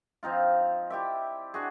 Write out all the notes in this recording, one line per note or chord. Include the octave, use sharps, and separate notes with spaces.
F3 C4 D#4 F4
E4 G4 D5 E5
D4 F#4 G#4